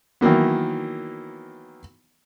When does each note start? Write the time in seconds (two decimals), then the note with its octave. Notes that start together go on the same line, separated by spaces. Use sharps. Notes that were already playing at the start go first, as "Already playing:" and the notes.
0.21 D#3 E3 F#3 A#3 B3